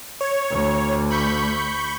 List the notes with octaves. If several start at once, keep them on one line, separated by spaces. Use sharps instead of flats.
C#5
D2
B5 C#6 G6